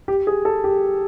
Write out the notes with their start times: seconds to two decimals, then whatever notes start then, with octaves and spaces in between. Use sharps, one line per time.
0.08 G4
0.27 G#4
0.45 A4
0.64 G4